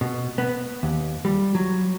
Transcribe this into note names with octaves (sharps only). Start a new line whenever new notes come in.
B2
B3
D#2
G3
F#3